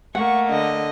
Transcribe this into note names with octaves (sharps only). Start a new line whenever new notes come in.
A3 A#3 F#5 C#6
D3 D#5